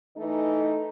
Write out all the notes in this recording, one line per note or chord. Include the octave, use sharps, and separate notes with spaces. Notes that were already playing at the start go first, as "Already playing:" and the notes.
E3 A3 D#4